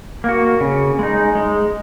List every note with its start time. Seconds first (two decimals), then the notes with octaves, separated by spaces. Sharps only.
0.24 A#3 F#4
0.61 C#3
0.99 G#3 D#4
1.35 G#3